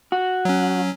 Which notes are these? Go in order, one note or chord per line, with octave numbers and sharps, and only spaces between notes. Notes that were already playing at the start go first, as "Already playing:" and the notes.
F#4
F#3 C#4